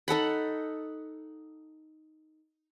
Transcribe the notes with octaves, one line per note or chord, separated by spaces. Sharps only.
D#4 A4 F#5 B5